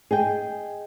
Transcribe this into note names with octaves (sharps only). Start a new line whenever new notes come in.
G#4 D#5 G5